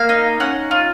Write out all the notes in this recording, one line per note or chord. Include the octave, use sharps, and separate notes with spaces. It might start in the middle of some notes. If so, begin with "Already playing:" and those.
Already playing: A#3 F5
D#4
C#4 F#5
F4